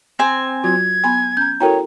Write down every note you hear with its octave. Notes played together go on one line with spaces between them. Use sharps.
C4 G#5
F#3 F4 F#4 G#6
B3 G#5 B5 C6
C#4 A#5 G6
E4 F#4 A4 A#4 C#5 G5 A#5